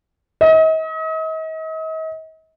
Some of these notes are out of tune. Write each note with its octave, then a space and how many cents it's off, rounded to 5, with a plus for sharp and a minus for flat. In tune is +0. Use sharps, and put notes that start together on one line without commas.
D#5 +40